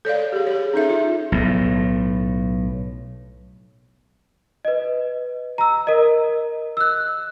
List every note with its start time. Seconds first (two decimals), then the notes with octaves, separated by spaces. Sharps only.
0.05 A4 C#5 D5 F5
0.32 G4 G#4
0.47 G#4 C#5
0.74 C#4 D#4 A4 E5
0.90 F4
1.32 B1 A2
4.65 B4 D#5
5.58 A#5 E6
5.87 A#4 D#5
6.77 E6 F#6